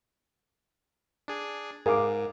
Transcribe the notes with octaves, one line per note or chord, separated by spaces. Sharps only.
D4 G#4
G#2 G#4 A#4 F5 D6